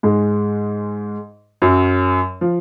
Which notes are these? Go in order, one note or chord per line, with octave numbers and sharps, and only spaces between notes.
G#2 G#3
F#2 F#3
F3